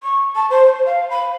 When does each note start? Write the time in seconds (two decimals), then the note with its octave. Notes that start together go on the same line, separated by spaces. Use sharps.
0.03 C#6
0.35 A5
0.50 C5
0.66 C5
0.86 F5
1.10 B5